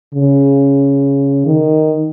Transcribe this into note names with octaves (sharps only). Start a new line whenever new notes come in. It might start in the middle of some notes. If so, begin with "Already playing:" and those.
C#3
D#3